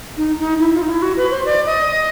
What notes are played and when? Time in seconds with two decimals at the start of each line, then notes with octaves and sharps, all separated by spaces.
0.17 D#4
0.39 D#4
0.60 E4
0.74 F4
0.82 D#4
0.89 E4
1.02 F#4
1.17 B4
1.31 C5
1.46 D5
1.66 D#5